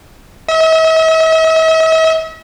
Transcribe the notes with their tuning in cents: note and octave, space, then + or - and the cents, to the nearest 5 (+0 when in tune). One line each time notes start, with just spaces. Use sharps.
E5 -45